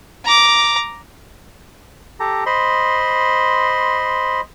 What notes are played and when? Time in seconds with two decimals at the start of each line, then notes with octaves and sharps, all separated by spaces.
0.25 A#5 D6
2.20 G4 A4 A#5
2.46 C5 D#5 B5 C6